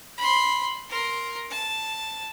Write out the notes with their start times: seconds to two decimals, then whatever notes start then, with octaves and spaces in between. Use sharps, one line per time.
0.18 B5 C6
0.90 A#4 C6
1.50 A5